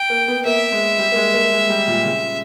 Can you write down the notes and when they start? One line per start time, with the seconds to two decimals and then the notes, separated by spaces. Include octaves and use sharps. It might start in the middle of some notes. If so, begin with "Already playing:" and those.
Already playing: G5
0.10 A#3
0.28 B3
0.45 A#3 E5
0.72 G#3
0.99 G3
1.12 A#3
1.16 G#3
1.34 A#3
1.52 G#3
1.70 G3
1.87 A#2
2.05 C#3